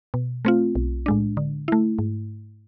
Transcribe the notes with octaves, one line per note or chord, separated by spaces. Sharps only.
B2
A3 C4 F4
B1
A2 G#3 D4
D3
A3 E4
G#2